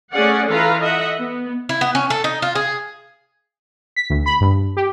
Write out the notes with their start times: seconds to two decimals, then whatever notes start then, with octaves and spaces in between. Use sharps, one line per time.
0.12 A3 C#4 G#4 D5 F#5
0.51 E3 F4 A4 B4 F5 A#5
0.82 D#5 E5 F#5
1.18 B3
1.69 E4
1.81 B3
1.95 C#4
2.10 A4
2.24 D#4
2.42 F4
2.55 G#4
3.96 B6
4.10 D2
4.26 B5
4.41 G2
4.77 G4